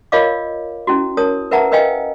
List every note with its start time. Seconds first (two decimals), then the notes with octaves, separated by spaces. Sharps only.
0.12 F4 A#4 C#5 D#5 F5 D6
0.87 C#4 E4 F#4
1.17 A#4 C#5 A5 D#6
1.51 A#4 B4 E5 F#5 A5 A#5
1.72 A#4 B4 D#5 F5 G5 G#5